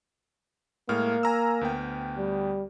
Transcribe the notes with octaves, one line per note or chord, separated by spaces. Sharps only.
A2 G#3 A#3 F6
G#5 A#5 E6
D2 B3 G5
G3